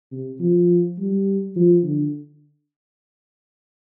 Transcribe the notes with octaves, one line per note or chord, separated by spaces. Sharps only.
C3
F3
G3
F3
D3